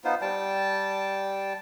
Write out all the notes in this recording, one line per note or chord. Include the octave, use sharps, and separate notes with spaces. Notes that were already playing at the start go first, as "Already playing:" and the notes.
B3 D#4 F4 C5
G3 G5 A5